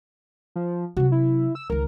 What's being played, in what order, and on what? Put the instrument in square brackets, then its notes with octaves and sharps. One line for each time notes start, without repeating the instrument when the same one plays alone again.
[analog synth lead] F3
[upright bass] C3 F#3 [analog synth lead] F#4
[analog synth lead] E4
E6
[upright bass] C#2 D#3 [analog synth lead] A#4